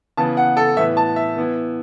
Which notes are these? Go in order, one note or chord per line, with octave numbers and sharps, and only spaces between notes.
C#3 E3 B3 A5
F#5
A4
A2 E3 B3 E5
A5
E5
E3 B3 E4